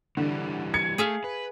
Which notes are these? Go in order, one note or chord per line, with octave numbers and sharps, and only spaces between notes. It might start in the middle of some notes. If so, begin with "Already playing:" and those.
D3 E3 G3
G#6 C#7
A3 G#4 E5 F5
B4